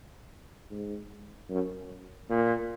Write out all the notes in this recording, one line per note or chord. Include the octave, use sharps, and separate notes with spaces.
G#2
F#2
A#2